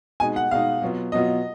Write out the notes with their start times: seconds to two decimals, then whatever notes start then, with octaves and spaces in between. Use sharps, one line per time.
0.20 B2 G#3 D#4 G#5
0.36 F#5
0.51 B2 G#3 D#4 F5
0.82 B2 F#3 B3 F4
1.12 B2 F#3 B3 F4 D#5